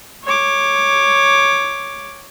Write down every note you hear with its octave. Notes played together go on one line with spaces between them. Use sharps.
C#5 D6